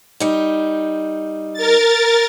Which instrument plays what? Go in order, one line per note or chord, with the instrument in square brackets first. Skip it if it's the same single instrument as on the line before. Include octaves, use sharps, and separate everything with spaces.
[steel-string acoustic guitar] G3 D#4
[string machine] A#4 A6